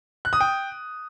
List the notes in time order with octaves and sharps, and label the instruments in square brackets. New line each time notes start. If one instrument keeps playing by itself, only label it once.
[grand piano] F#6
D#6
G5